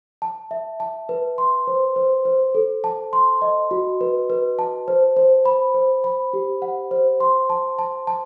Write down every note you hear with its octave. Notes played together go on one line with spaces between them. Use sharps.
A5
E5
A5
B4
C6
C5
C5
C5
A4
A5
C6
D#5
F#4
B4
B4
A5
C5
C5
B5
C5
B5
G4
F#5
C5
C6
A5
A5
A5